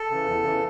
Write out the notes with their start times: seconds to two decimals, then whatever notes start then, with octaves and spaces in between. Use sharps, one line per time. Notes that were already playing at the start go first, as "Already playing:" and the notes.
Already playing: A4
0.10 C#3 E3
0.26 E2
0.43 C#3 E3